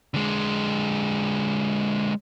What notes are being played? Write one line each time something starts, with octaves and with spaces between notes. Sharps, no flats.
D3 G#3